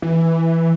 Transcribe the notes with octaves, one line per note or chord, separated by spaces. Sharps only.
E3